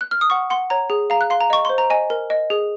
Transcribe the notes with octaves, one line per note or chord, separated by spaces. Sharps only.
F#6
F6
D#6
F#5 C#6
F#5 C6
C#5 A#5
G#4
F5 A#5
F#6
F5 C6
A#5
D#5 C#6
C5 C6
A#5
D#5 G#5
A#4
D#5
G#4